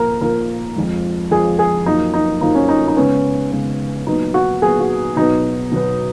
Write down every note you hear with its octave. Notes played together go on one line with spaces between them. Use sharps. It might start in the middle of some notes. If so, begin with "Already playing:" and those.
Already playing: A#2 F3 A#3 A#4
A#2 F3 A#3 A#4
F2 F3 G#3
F2 F3 G#3 G#4
G#4
F#2 F3 A#3 D#4
D#4
F#2 F3 A#3 D#4
C#4
D#4
D#4
C#3 G#3 B3 C#4
C#3 G#3 B3
A#2 F#3 B3 D#4
F#4
A#2 F#3 B3 G#4
F#4
B2 F#3 B3 D#4
B2 F#3 B3